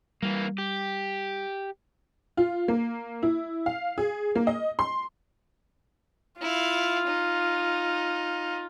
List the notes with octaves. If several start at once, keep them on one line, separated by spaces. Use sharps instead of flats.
E3 G3 A#3
G4
F4
A#3
E4
F5
G#4
A#3
D#5
C6
E4 F4 F5
D#4